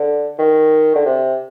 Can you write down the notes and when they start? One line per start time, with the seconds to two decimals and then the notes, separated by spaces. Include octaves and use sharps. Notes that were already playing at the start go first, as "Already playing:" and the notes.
Already playing: D3
0.39 D#3
0.95 D3
1.06 C3